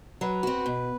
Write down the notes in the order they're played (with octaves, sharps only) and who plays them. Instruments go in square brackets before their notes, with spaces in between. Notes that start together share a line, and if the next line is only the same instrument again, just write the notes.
[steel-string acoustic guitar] F#3 [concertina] B4
[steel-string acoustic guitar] C4 F#4
B2